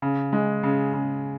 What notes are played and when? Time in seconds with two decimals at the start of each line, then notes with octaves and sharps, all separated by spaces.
0.02 C#3
0.33 G#3
0.63 C#3
0.93 C#3